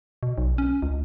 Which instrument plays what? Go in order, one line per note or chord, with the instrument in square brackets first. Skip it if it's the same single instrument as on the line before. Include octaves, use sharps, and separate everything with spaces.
[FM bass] B2
B1
C#4
C#2